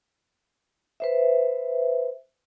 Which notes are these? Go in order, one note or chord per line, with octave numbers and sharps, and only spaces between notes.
B4 C5 E5